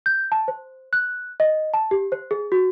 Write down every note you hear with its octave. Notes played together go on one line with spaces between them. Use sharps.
G6
A5
C5
F#6
D#5
A5
G4
C5
G#4
F#4